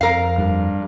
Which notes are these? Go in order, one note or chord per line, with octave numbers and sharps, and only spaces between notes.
F2 A#4 F5
G2